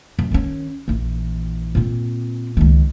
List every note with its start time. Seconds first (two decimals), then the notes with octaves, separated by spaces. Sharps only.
0.19 F#2
0.31 D#3 C#4
0.88 A#1 E3
1.75 A#2 C4
2.57 C#2 D#3